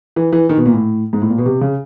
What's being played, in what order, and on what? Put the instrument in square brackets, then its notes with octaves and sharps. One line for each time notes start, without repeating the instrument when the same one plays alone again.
[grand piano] E3
E3
D#3
B2
A#2
A2
G#2
A2
A#2
B2
C3
C#3